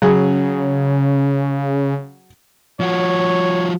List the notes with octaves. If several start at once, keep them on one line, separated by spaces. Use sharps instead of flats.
C#3 F#3 G#4
F3 F#4 C#5